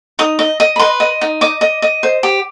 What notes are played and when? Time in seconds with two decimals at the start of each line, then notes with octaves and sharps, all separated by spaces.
0.19 D#4 D#6
0.39 D#5
0.60 D#5
0.76 B5
0.79 B4 C6
1.00 D#5
1.21 D#4
1.41 D#5 D6
1.61 D#5
1.82 D#5
2.03 C5
2.23 G4